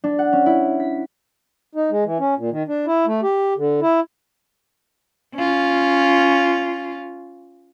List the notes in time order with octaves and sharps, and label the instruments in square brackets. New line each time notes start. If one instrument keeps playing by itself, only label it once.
[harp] D4
F#5
C#4
E4
B6
[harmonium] D#4
G#3
E3
C#4
A#2
D#3
D4
E4
A3
G4
D3
E4
[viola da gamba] C#4 F4